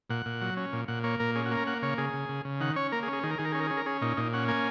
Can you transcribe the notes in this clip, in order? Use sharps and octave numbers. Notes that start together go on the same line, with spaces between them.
A#2 F#5
A#2
F#3
C#4
A#2
A#2 F#5
A#3 C#5
A#2 A#4
C#4 G#4
F#4
A#3
A#4
A#3 F#5
C#3 C#5
C#3 G#4
C#3
C#3
C#3
D#3 F#5
C#4 C#5
A#3 A#4
G#4
C#4
G#4
D#3 G#4
A#4
D#3 G#4
A#4
C#4 G#4
A#4
C#4 G#4
A#4
C#4 G#4
A#2 D#4
A#2 D#4
C#4 F#5
A#3 G#5